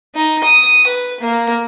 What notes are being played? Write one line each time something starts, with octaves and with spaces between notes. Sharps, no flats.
D#4
D#6
B4
A#3